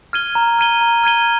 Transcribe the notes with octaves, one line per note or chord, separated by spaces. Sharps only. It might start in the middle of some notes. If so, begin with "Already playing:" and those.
F6 G#6 D#7 G7
A#5
F6 G#6 D#7 G7
A#5
F6 G#6 D#7 G7